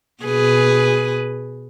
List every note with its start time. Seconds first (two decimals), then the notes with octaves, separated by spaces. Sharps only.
0.24 B2 G#4 B4